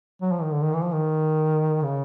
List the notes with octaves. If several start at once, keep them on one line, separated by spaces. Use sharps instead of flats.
F#3
F3
D#3
D3
D#3
E3
F3
D#3
C#3